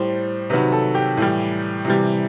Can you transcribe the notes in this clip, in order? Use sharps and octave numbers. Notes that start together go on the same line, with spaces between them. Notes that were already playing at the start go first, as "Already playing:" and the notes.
Already playing: A2 G3 C5
C3 D#3 F#3 B4
A4
G4
A2 E3 G3
C3 E3 G3